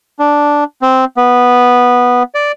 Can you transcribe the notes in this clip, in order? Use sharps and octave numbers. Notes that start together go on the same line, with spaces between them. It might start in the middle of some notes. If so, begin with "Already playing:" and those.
D4
C4
B3
D5